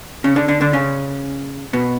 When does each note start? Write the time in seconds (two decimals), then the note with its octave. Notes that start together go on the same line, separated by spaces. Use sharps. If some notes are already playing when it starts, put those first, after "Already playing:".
0.24 C#3 C#4
0.36 D3 D4
0.48 D3 D4
0.61 D3 D4
0.73 C#3 C#4
1.73 B2 B3